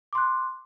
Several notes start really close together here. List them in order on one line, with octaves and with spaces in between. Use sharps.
D6 C6 F#6